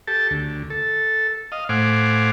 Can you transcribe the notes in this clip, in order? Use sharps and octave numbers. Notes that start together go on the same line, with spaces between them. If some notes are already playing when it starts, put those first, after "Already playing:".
G4 A4 A5
D2
A4
D#5 F5
A2 C5 F5 F#5 G#5 D6